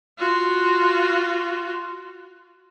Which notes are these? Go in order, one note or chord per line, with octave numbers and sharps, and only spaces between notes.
F4 F#4